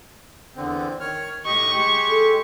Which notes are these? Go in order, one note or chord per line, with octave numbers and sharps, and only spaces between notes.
E2 D3 C4
D#3 C#5 F6
A2 G4 D#5 C#6
G#3 G4
A4